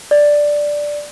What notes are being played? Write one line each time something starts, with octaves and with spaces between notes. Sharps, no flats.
D5